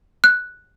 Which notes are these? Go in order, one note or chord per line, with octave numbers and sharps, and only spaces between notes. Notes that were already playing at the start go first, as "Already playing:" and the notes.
F#6